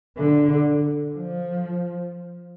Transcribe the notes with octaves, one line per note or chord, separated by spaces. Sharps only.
D3
F3